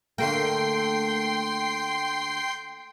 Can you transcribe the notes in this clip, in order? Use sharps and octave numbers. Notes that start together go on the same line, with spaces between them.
D3 A3 A#3 G5 C6 C7